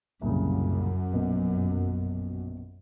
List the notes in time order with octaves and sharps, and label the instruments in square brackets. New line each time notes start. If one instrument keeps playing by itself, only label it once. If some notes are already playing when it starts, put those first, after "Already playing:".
[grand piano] C2 A#2 C#3 [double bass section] F#2
[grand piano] A#1 B2 B3